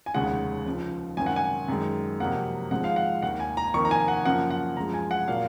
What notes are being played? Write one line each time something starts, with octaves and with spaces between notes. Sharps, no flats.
G#5
F1 D#2 C#3 G#3 F#5
C#2 C#3 F3
G#1 F#2 D#3 G#5
F#5
G#5
F#2 D#3 G#3
F2 C3 F#3 A#3 F#5
G#1 G#2 F3 G#3 F#5
F5
F#5
D#2 D#3 A#3 F#5
G#5
A#5
F2 D#3 A#3 C#6
A#5
G#5
F#5
F#2 C#3 F3 A#3 F#5
F#5
F#2 F3 G#3 A#5
G#5
F#5
A#2 F#3 A#3 F5